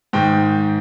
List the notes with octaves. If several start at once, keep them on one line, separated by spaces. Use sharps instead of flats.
G#2 D#3 G5